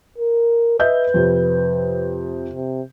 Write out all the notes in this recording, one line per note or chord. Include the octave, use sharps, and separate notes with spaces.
A#4
B4 D#5 E5 G6
F2 C3
C3